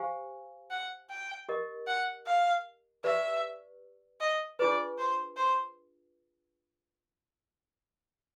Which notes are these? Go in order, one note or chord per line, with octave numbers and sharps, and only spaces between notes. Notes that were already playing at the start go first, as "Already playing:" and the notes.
Already playing: G4 C5 F5 G#5
F#5
G5
G4 A#4 D#5
F#5
F5
G4 B4 D5 E5
D#5
D4 F4 G#4 B4 D5
C5
C5